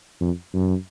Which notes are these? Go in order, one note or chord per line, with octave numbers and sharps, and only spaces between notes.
F2
F#2